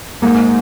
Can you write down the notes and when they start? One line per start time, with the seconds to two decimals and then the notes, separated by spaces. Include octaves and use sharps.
0.22 G#2 A#3